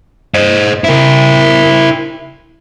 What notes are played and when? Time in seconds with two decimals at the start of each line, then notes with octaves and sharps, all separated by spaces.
0.34 C5 D#5
0.84 E4 A#4